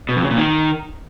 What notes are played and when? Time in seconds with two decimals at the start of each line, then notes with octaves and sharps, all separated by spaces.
0.09 B2
0.16 F2
0.23 C#3
0.31 A#2
0.38 D#3